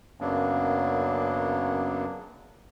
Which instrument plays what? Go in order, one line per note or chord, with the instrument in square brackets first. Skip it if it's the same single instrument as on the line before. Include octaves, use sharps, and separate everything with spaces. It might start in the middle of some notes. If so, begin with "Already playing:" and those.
[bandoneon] F#2 C#3 F#3 A#3 B3 D4